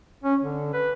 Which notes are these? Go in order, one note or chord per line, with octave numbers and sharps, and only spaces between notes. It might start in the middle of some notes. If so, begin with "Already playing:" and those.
C#4
D3
B4